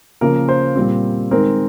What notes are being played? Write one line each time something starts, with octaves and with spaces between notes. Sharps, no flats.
C#3 F3 A#3 A#4
C5
A#2 G3 C4
D#3 G#3 C4 A#4